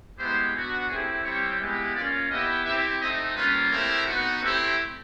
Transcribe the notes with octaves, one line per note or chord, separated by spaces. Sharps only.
G#3 B3 E4 G4 C5
B3 D4 F#4
A3 C4 E4 G4 G#4
G3 C4 E4 G4 C#5
G#3 B3 E4 G4
A#3 C#4 F4 D5
B3 E4 G4 D#5
C4 E4 G4 E5
A3 C4 D#4 D#5
G3 A#3 C#4 F4 B4
A3 C4 E4 G4 A#4
B3 D#4 F#4
A3 C4 E4 G4